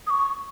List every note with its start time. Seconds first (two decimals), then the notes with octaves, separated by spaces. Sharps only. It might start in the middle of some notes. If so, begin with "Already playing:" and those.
0.07 D#6
0.10 C#6